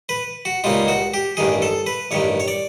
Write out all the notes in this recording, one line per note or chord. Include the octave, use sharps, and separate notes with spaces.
B4
F#4
C#2 B2 G3 A#3 D#4 F4
F#4
G4
A1 G2 D#3 G#4
A4
B4
A1 G2 D#3 C#5
C#5
D5